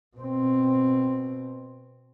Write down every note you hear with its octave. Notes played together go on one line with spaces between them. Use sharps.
B2 C4